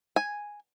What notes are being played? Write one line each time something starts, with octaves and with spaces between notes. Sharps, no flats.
G#5